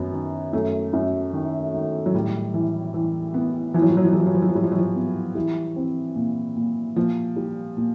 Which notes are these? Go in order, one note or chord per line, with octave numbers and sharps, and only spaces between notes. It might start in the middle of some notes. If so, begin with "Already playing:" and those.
Already playing: F#2 D#3 B3
D#3
F#2 A3
F#2
D#3
D#3
F#3
A2 G3
E3
E3
B3
E3 F3
F#3
F3
F#3
F3
F#3 G3
F3
F#3
F3
F#3
F3
F#3 G3
F3
F#3
F3
B3
E3 G3
C4
A#2
A#2
A#2 F3
G3
A#2